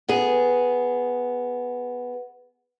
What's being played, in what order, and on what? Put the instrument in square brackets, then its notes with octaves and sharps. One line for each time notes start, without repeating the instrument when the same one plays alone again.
[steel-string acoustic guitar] B3 G#4